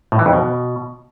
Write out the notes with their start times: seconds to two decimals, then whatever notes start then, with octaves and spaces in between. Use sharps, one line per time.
0.12 A2
0.19 E3
0.26 F2
0.33 B2